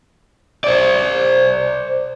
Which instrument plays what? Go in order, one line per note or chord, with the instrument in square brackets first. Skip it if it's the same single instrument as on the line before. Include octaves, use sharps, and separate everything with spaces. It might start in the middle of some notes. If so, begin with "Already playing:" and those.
[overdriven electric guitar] C5 D5